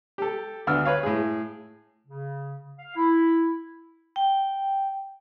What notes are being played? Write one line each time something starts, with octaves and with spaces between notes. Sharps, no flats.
G4 A4
D2 B3 D4 E6 F6
B4 C#5 F5
A2 G#4
C#3
F5
E4
G5